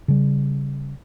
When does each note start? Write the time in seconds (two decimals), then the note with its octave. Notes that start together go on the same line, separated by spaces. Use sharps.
0.08 C#3 G3